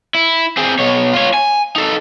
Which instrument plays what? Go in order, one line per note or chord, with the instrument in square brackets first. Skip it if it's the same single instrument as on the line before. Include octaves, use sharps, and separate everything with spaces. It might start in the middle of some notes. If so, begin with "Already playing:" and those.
[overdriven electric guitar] E4
C4 G#4
B2 C#5
F4 C#5
G#5
D#4 A4